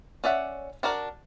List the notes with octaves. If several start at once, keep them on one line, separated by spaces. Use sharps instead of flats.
C#4 D5 E5 F#5
D4 F#4 A#4 D5